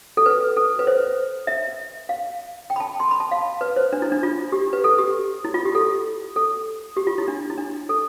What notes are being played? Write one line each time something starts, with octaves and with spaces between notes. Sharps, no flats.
A4
B4
A4
B4
C5
E5
F5
G5
B5
A5
C6
B5
A5
F5
B4
C5
D4
E4
D4
F4
G4
B4
A4
G4
E4
F4
G4
A4
A4
G4
F4
E4
D4
E4
D4
A4